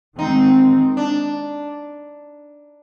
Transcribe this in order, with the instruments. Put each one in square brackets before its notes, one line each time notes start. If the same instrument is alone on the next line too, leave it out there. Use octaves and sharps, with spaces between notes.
[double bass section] D#3 G#3 C4 [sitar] D#4
[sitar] D4